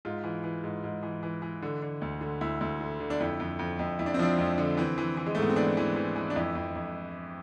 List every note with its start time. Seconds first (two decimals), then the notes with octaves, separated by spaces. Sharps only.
0.05 G#2 F4
0.24 E3
0.44 E3
0.64 G#2
0.84 G#2
1.03 E3
1.23 E3
1.42 E3
1.62 D3
1.82 D3
2.02 D2
2.21 D3
2.41 D2 E4
2.61 D2
2.81 D3
3.00 D3
3.10 D4
3.20 F2 E4
3.40 F2
3.59 F2
3.79 F2
3.99 F2 E4
4.06 D4
4.14 C4
4.19 F3 D4
4.38 F2
4.58 D3
4.77 E3 C4
4.98 E3
5.17 E3
5.26 G#3
5.35 A3
5.38 G#2 B3
5.49 C4
5.56 E3 D4
5.77 E3
5.96 E3
6.16 E3
6.30 D4
6.36 F2 E4
6.55 F2
6.75 F2